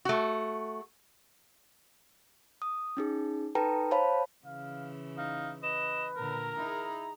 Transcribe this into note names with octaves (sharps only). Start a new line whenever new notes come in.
A3 F#4
D#6
C#4 D#4 G#4
D#4 A4 B4 G5 A5 A#5
C5 C#5 F5 A5 B5
C#3 E3 F5
D#4 F5
B4 D#5 E7
A#2 D3 A#4 A#5
D#4 E4 G#4